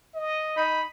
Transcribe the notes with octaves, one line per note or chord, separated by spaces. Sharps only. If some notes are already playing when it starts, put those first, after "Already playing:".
D#5
D#4 B5